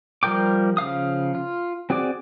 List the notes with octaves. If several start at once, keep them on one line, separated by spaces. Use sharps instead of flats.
F3 G3 A#4 G5 D6
C#3 F3 F5 D#6
F4
C4 F#4 G#4 D5 D6